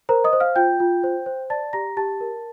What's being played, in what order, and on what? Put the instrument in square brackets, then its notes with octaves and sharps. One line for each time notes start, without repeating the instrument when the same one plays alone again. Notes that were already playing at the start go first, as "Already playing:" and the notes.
[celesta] A#4 C5 A#5
D#5 D#6
C5
F5 F6
F4 G5 G6
F4
C5
C5
D5 A5 A6
G4 A#5 A#6
G4 A5 A6
A#4